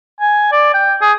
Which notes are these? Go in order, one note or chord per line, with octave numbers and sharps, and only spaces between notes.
G#5
D5
G5
G#4